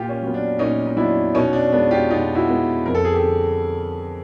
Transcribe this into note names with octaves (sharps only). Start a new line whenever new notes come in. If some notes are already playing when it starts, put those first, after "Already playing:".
Already playing: A#2 F4 G4
C#4
F#3 B3
D4
A#2 C#4 D#4
D#4
F#3 B3 D4 E4
B2 C#4 D#4
D4
G#3 B3 D4
F4 G4
B2 D#4 F4
E4 F#4
G#3 B3
F2 A#4
A4
G#4
G4 A4
D3